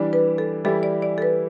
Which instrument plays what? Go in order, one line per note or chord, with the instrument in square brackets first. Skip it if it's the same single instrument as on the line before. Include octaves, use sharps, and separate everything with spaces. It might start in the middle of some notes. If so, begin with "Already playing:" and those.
Already playing: [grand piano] E3 G3 D4
[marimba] B4
A4
[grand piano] E3 G3 E4 G4 [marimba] A4
[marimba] D5
D5
A4
B4